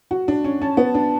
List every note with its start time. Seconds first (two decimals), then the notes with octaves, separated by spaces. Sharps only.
0.11 F#4
0.28 D4
0.44 C#4
0.61 C#4 A5
0.77 B3
0.94 D4